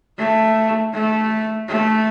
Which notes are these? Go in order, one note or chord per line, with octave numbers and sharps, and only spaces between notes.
A3
A3
A3